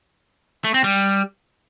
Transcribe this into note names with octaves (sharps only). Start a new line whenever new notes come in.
A3
C4
G3